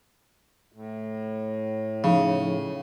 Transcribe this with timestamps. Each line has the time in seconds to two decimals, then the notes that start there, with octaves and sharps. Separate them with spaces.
0.72 A2
2.04 C#3 F3 D#4